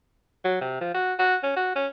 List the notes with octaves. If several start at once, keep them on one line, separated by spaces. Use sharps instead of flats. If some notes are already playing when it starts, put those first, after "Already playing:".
F#3
C3
F3
F#4
F#4
C#4
F#4
C#4